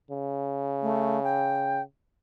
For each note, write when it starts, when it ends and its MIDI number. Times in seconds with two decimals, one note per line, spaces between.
0.11 1.82 49
0.82 1.21 57
1.23 1.82 79